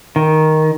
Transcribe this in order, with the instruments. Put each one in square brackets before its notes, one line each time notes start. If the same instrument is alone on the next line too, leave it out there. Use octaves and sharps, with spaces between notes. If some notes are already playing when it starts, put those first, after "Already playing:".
[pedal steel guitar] D#3